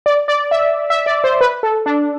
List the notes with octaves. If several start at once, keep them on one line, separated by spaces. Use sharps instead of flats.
D5
D5
E5
E5
D5
C5
B4
A4
D4